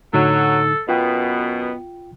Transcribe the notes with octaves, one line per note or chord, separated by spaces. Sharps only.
A2 D3 F#3 D#4 A4
F#2 B2 B3 F4 G5